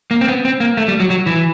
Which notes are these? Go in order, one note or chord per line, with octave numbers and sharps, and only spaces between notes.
A#3
C4
B3
C4
A#3
A3
G3
F#3
F#3
E3